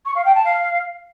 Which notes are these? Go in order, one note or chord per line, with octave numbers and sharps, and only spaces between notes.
C#6
F5
G5
A5
F5